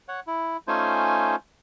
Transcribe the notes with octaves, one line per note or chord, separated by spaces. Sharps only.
C#5 F#5
E4
A3 C#4 D#4 F4 C5 G#5